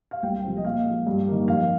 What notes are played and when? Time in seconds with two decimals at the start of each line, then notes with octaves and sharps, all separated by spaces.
0.11 F5
0.23 C2 G5
0.43 C3 F3 G#3 C4
0.57 D#5
0.65 A#2 F5
0.86 F3 G#3
1.07 G2
1.27 D#3 A#3
1.48 F2 F5